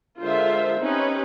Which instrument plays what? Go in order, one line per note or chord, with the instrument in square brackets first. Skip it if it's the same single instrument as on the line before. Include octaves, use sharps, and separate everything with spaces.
[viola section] D3 G#3 F4 A#4 C5 E5
C4 C#4 D#4 G4 B4